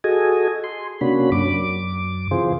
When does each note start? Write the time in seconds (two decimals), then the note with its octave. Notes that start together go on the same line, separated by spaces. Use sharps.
0.04 F#4 G#4 A4 D#5 G#5
0.64 C6
1.01 C3 A#3 C#4 D4 F#4 B5
1.32 F#2 D6
2.31 C3 E3 F4 G#4 C5